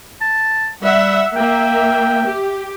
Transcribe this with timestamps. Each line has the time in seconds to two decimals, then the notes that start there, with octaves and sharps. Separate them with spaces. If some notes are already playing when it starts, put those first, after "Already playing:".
0.21 A5
0.83 G3 E5 F#5
1.36 A#3 E5 G5
2.26 G4